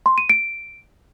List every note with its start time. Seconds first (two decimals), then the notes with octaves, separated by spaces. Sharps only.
0.06 C6
0.18 D#7
0.30 D7